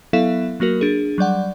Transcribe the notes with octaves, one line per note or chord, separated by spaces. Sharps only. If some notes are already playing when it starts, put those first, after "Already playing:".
F#3 B3 E4 A4 E5 F5
F#3 A#3 F#4 A#4
D4 G#4
F#3 G3 D5 F#5